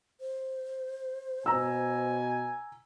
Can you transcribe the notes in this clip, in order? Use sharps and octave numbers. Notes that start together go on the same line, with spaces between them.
C5
B2 G#5 A#5 E6